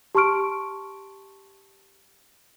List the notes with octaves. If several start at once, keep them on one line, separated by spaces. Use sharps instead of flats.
G4 A5 C6 C#6 F6 D7